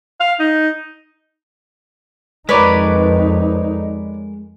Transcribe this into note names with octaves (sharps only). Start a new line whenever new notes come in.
F5
D#4
F2 G#3 D#4 A#4 B4 C#5 D5